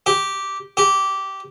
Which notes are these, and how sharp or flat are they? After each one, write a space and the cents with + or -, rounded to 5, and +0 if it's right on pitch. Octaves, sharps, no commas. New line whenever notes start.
G4 -10
G4 -15